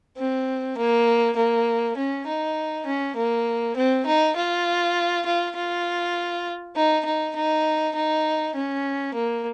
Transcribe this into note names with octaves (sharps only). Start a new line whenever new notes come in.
C4
A#3
A#3
C#4
D#4
C#4
A#3
C4
D#4
F4
F4
F4
D#4
D#4
D#4
D#4
C#4
A#3